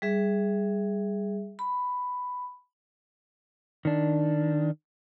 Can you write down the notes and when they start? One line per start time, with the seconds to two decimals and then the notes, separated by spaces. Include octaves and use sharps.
0.02 G3 G#4 E5
1.59 B5
3.85 D#3 D4